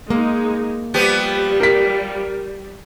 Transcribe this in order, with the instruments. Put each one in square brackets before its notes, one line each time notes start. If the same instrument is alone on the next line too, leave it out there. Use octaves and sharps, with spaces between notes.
[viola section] G#3 D#4 [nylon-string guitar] A#3
[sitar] F3 B3 G4 [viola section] G3
[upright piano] A#4 B6